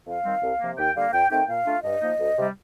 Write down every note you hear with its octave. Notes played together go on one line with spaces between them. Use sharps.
F2 F5
D#3 G3 C4
C2
C3 F3 A#3
D#2 G5
D3 G3 A#3 F5
F2 G5
D#3 A3 C4 D#4 G5
A#2 F5
A3 D4 F4
G2 D#5
F3 A#3 D#4
D2
C3 G3